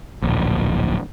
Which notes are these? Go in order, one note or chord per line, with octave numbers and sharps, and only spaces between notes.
D1 A#1